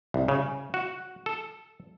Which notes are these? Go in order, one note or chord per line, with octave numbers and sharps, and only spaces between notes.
C2
C#3
F#4
A4